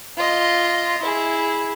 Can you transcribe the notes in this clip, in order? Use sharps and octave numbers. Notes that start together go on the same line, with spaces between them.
F4 D#5
E4 G#4